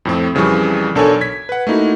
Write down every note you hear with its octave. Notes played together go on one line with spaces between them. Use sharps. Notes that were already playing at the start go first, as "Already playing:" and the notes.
F2 A2 C4
F2 C#3 E3 F3 G3 C#6
B1 D4 A4 A#4 C#5 G#5
G#6 B6
B4 F#5
A3 A#3 D#4 E4 F#4